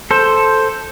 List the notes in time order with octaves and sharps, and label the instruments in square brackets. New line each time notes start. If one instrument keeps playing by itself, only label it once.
[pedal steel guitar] A4 C5